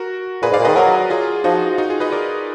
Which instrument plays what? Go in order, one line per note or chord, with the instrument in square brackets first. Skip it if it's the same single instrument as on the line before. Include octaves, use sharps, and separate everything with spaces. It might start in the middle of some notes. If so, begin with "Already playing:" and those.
Already playing: [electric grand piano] F#4 A#4
[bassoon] A#2 [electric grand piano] G#4 B4
[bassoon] G#2
[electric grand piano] D5 F5
[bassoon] A#2
[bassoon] D#3 [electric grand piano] B4 D#5
[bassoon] F#3 [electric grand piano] F#4 A#4
[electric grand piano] F4 G#4
[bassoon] F3 [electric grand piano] D#4 F#4
[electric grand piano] D#4 F#4
F4 G#4
B4 D#5
A#4 D5